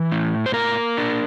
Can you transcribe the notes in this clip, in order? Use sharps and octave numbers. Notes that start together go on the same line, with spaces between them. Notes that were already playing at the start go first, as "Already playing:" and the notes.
Already playing: E3 E5
A2
C5
A#3 A#4
D4